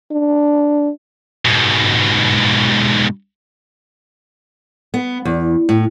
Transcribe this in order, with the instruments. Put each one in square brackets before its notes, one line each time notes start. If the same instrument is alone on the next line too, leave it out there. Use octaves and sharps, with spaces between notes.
[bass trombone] D4
[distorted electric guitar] G#2 B2
[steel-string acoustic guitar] B3
E2
A2